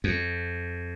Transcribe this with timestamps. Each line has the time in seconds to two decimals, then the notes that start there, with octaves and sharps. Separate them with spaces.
0.04 F2